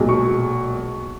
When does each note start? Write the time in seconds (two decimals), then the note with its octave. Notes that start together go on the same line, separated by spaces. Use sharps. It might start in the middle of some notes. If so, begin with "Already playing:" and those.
Already playing: B1 A#2 G#3
0.09 C#6